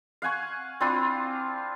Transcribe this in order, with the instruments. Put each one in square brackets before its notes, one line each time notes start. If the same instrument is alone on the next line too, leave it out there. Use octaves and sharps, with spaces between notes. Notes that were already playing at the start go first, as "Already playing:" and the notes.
[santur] F5 F#5 G#5 C#6
C4 D4 E4 F4